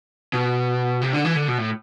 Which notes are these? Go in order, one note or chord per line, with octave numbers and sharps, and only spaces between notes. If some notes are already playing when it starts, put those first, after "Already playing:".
B2
C3
D3
E3
D3
B2
A2